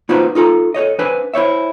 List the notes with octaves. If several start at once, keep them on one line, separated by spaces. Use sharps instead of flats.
A#3 D#4 F4 F#4 B4 C5
D#4 F4 A4 A#5
A4 C5 C#5 D#5
D4 B4 C5 G#5
E4 C5 C#5 E5